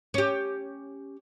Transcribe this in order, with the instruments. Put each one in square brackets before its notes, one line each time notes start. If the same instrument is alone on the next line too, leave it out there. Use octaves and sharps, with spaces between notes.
[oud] C#4 G4